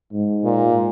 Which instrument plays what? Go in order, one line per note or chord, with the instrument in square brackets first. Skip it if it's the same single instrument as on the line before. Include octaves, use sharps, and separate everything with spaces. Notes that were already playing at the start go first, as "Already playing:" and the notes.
[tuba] G#2
[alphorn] A#2